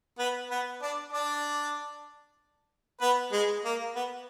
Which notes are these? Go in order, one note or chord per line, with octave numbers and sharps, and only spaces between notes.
B3 B4
B3 B4
D4 D5
D4 D5
B3 B4
G#3 G#4
A#3
B3